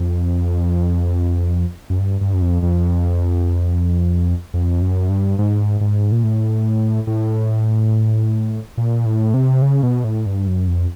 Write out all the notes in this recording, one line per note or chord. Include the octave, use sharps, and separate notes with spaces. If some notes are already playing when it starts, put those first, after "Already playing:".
Already playing: F2
F#2
G2
G2
F#2
F2
F2
F2
F#2
G2
G#2
G#2
A#2
A2
A2
A#2
A2
C3
C#3
B2
A2
G2
F#2
F2